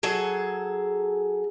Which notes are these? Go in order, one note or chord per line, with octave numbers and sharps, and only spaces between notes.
F#3 G#4 A4